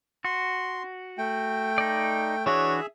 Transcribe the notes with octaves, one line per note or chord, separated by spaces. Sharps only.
F#4 C6
A3 G5
D#4 D5
E3 D4 F#4 G#4 C#5 E5